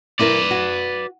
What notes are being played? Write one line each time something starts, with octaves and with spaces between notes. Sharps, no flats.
C4 E4 A#4 B4 D5
F#4